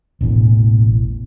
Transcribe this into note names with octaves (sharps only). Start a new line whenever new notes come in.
E1 A1 E2